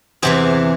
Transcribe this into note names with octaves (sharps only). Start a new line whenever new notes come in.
E2 C3 E3 G#4 C5